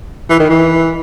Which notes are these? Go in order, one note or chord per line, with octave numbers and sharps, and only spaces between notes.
E3
D#3
E3